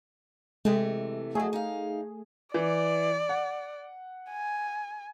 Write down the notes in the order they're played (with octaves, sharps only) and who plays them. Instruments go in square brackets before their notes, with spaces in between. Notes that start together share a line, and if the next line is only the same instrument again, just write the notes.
[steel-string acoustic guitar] C3 E3 A3 [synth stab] G#3
[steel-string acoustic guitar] F2 F#3 [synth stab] A3 G#4
[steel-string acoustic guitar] D#4 F5
[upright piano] E3 [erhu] D5
[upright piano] F#5
[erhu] G#5